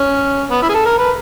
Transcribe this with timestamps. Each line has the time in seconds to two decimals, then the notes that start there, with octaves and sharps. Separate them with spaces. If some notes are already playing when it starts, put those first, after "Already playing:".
Already playing: C#4
0.50 B3
0.62 E4
0.69 G#4
0.74 A4
0.86 A#4
0.98 B4